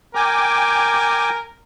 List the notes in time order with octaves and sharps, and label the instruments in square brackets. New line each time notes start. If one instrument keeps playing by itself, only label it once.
[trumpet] A#4 [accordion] G5 G#5 D6